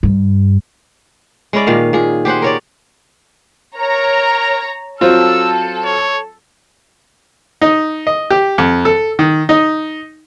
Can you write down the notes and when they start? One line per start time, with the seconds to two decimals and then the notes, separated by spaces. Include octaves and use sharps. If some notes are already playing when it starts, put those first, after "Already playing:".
0.03 G2
1.53 G#3 C#4 E4 D5
1.67 A#2 D#3 F5
1.93 A#2 G#4
2.25 G4 G#4 C5 F#5
2.42 A#4 C#5 D5
3.77 A#4 C#5 A#5
5.01 F#3 C4 F4 A4 E6
5.85 C#5
7.61 D#4
8.07 D#5
8.30 G4
8.58 F2
8.85 A4
9.19 D#3
9.49 D#4